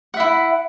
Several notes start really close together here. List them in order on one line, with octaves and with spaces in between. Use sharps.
F#5 E5 E4